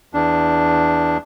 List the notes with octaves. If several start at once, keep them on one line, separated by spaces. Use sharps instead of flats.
E2 D4